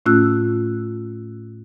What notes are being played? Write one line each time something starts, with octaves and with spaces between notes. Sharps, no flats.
A2 A3 C#4 F4 E6 F#6